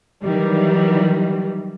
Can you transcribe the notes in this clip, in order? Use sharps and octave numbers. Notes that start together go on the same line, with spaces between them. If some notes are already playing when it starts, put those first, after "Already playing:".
D#3 E3 F#3 G3